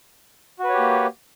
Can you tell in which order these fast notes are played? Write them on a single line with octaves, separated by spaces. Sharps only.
F#4 B4 C#5 G4 A#3